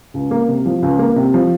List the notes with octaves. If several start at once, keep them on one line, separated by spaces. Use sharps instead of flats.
C#2
A#3
C3
F3
C#2
A#3
C3
F3